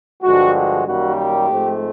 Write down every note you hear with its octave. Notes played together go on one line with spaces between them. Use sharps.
G2 D3 F3 G#3 F#4
F#4
F#2 D#3 G3 A#3 F#4
G4
G#2 F3 A3 C4